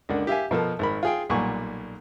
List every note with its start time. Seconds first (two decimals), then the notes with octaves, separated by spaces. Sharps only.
0.09 C#2 D3 A#3 D4 F#5
0.27 G4 E5 F5 G#5
0.51 B2 F3 A4 A#4
0.79 G#1 A#4 B5
1.03 F4 G#4 G5
1.29 B1 A#2 G3 F#5 G#5 C#6